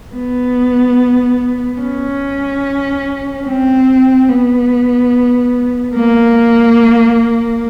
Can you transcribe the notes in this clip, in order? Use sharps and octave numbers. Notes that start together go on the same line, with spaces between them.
B3
C#4
C4
B3
A#3